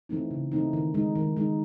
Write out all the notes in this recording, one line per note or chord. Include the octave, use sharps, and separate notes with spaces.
E3 A3 C4 D#4
C#3
E3 A3 C4 D#4
D#3
G#3 D#4
D#3
G#3 D#4